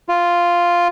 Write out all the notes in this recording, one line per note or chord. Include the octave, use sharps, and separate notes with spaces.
F4